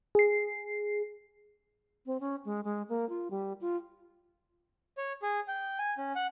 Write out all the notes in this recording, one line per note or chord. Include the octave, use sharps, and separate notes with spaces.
G#4 C7
C4
C#4
G#3
G#3
A#3
F4
G3
F4
C#5
G#4
G5
G#5
C#4
F#5